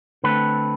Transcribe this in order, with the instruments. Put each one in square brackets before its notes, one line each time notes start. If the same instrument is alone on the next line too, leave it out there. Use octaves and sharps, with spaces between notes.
[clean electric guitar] D3 A3 C4 B4